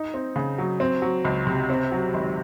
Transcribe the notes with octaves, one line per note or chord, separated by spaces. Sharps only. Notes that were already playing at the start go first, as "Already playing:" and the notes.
Already playing: D#4
C4
C#3
F#3
C4
F#3
C#2
C3
C4
F#3
G#1